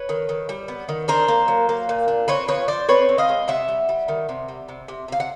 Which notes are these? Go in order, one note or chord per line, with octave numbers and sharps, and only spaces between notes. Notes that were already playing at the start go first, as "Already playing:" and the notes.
Already playing: B4 C#5
D#3
D#3
G3
B3
D#3
D4 A#4 C5
A#3
F#3
A#3
A#2
D4
C4 B4 C#5
F3 B4 C#5
C4 C5 D5
C4 B4 C#5
C4
D#5 F5
G#3
C3 E5 F#5
G3
G3
D#3
C3
G3
C3
C3
C3 F5
F#5